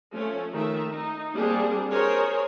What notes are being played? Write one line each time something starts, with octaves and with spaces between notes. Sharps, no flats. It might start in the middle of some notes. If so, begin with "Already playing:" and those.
F3 A3 C#4
D#3 A3 E5
D#4
G3 A#3 C4 D4 G#4
G#4 A#4 C5 C#5